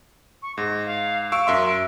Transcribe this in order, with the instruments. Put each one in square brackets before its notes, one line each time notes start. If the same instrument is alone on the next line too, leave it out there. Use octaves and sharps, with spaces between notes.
[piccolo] C#6
[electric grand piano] G#2 [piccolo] A#6
[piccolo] F5
[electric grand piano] F5 C#6 E6 [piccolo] D7
[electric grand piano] F#2 E5 C6